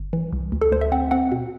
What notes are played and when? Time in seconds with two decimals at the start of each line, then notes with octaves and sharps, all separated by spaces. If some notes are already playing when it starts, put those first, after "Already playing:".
Already playing: G1
0.13 E3
0.33 C2
0.52 D2
0.61 A4
0.72 D2 C5
0.81 E5
0.92 C4 F#5
1.11 C4 F#5
1.32 B2